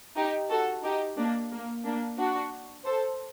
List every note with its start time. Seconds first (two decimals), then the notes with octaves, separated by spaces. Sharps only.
0.16 D#4 G4
0.50 F#4 A4
0.84 D#4 G4
1.17 A#3 D4
1.51 A#3
1.84 A#3 D4
2.18 D4 F#4
2.85 A4 C5